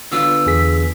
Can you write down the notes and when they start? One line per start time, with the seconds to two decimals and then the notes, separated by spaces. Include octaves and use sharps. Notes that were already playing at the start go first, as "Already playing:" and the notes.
0.12 D3 B3 F4 E6
0.46 E2 G#4 B6